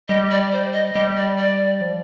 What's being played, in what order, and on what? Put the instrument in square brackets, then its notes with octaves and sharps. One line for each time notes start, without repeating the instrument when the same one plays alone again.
[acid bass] G3 [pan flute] D#5
[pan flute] D5
C5
D#5
[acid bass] G3 [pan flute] D#5
[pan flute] D5
D5
[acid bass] F3